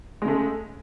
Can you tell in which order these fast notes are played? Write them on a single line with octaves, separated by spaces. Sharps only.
G#3 C#3 A3